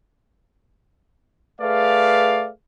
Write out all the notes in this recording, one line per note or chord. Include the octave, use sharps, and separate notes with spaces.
A3 G#4 B4 D5 F5